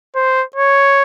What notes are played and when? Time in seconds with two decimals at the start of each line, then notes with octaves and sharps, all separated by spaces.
0.16 C5
0.56 C#5